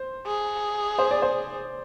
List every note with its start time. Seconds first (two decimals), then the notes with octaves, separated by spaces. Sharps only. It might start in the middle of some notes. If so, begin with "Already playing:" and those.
Already playing: C5
0.27 G#4
0.99 C5
1.11 D5
1.22 C5